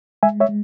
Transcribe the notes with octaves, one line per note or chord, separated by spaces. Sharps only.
G#3 E5 G#5
C#5 E5
G#3